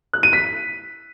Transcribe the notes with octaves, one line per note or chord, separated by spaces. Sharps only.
F#6
D#7
B6